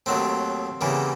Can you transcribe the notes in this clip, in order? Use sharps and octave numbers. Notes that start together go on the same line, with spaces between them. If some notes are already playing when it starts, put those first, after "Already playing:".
D#2 D#3 F#3 A3 C4
E2 C#3 E3 G3 A#3